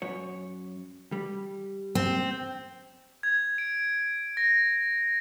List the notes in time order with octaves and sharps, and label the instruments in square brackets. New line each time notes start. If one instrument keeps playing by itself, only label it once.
[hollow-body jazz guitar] F#2 C#5
G3
[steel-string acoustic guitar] C4
[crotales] G#6
D7
A#6